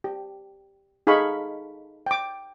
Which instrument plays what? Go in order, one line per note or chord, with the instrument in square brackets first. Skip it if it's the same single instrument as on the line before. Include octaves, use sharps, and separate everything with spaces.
[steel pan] G4
D#4 G#4 A4 F5 B5 C#6
G5 D6